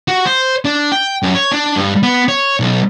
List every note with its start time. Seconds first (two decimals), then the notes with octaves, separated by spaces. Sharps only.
0.08 F#4
0.25 C5
0.65 D4
0.92 G5
1.23 F#2
1.35 C#5
1.52 D4
1.76 G2
2.03 B3
2.28 C#5
2.60 B1